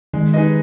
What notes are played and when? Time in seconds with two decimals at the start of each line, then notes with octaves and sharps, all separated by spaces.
0.14 D#3 G#3
0.34 D#4 G#4 B4 D#5